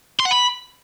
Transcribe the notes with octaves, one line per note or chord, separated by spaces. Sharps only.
C6
F#5
B5